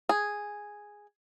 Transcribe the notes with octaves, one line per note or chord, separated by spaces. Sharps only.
G#4